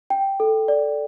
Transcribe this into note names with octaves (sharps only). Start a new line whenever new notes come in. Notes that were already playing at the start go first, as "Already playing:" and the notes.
G5
A4
D5